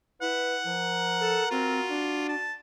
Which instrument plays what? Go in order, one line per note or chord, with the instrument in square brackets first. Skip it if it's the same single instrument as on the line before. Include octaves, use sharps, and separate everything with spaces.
[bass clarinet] E4 [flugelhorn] B4 [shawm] F#5
[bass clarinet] F3 [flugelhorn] A#4
[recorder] A4
[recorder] C4 [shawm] F4 [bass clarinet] F#4
[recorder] D4
[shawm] A5